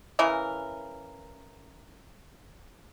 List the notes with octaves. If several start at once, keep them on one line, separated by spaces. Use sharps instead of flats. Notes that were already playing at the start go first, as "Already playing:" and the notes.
C#3 E3 A#4